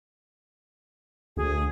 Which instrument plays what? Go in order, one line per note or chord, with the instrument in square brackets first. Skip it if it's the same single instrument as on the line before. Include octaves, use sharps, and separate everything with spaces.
[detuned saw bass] D2 [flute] G#4